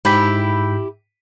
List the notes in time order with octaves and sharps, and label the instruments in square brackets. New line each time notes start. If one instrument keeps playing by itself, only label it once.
[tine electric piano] G#2 G6 B6 [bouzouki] E4 G4